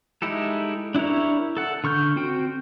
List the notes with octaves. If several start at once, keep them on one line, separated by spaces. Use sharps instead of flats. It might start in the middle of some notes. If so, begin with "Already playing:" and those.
G#3 D#4 E4 G4 A4
D4 E4 G4 A#4 C#5
A4 F#5
D3 C#6 F6 G6
C4 F#4 G5